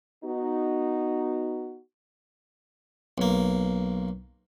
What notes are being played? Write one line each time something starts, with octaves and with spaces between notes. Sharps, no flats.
B3 D#4 F#4
B1 A#3